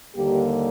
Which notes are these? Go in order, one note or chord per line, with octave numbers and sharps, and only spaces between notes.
D#2 D3 G3 A#3 G4